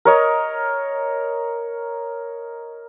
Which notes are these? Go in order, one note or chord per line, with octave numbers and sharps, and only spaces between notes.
A#4 C#5 D#5